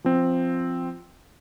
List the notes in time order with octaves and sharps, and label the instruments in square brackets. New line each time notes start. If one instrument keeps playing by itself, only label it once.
[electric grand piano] F3 C4